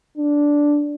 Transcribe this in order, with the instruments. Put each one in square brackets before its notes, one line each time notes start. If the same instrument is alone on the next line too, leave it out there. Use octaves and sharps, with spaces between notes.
[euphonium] D4